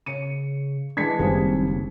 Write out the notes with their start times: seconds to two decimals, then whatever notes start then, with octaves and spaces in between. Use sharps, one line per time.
0.06 C#3 C#5 C#7 D#7
0.97 E3 G#3 D4 G#6 B6 C#7
1.19 F#1 D#2 G3 C4 G#4 C5